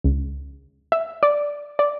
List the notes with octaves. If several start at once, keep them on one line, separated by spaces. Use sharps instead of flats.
C#2
E5
D5
D5